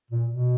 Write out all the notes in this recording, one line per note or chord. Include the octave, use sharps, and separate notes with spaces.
A#2
B2